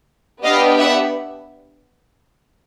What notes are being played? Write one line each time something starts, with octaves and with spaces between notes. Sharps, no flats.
B3 D4 G4 D#5 F5
E5 F#5